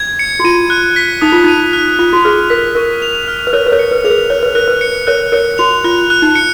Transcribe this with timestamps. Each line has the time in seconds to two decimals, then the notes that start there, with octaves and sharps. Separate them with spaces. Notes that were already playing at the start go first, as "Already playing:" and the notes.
Already playing: G#6
0.19 C#7
0.40 F#4
0.44 F4 D#7
0.70 F#6
0.96 B6
1.21 D#4 D#6
1.32 F4
1.44 D#4 D#7
1.73 F#6
1.99 F4 F7
2.13 F#4
2.24 G#4 F6
2.50 A#4 B6
2.75 A#4 C#6
3.02 F7
3.28 F6
3.47 B4
3.53 A#4 C#5 F#6
3.66 B4
3.72 A#4 C#5
3.79 C#7
3.91 B4
4.04 G#4 F7
4.11 A#4
4.30 C#5 F#6
4.43 B4
4.55 A#4 F#6
4.68 B4
4.81 C#7
5.07 A#4 C#5 F#6
5.32 A#4 C#5 C#7
5.58 F#4 F7
5.84 F4 F#6
6.10 F#6
6.22 D#4
6.35 C#7